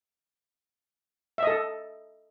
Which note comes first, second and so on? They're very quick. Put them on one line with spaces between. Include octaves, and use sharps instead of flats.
E5 D#5 A4